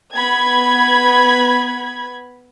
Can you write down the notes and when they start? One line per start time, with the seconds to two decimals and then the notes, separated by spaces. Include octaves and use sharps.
0.14 B3 B5 G#6